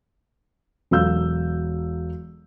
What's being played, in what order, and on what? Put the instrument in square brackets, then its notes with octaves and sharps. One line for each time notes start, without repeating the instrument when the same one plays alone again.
[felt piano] E1 F#3 A4 F5 E6 G6